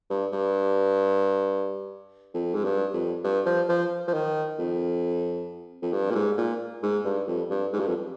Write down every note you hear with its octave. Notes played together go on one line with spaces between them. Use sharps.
G2
G2
F2
G#2
G2
F2
G2
F3
F3
F3
D#3
F2
F2
G2
A#2
G#2
A#2
G#2
G2
F2
G2
G#2
G2
F2